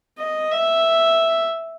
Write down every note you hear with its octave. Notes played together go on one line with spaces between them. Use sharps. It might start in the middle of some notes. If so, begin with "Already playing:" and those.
D#5
E5